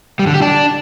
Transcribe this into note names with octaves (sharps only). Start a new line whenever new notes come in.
G3
D3
G4
D4